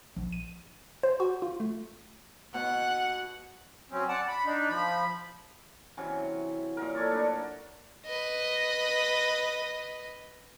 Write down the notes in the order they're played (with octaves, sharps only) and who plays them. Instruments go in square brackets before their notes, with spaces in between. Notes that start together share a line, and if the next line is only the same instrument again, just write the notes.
[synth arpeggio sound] A#1
D#7
C5
F#4
F4
A3
[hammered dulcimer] B2 [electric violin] F#5
[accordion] F#3 C4 C#4
D5 F#5 A5
B5
D4 D#4
F3 B5
[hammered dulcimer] C3 E3 F#3 C#4
A#2 F#3 A#4
A4 C#5 D5
A3 D4 A#4
[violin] B4 D#5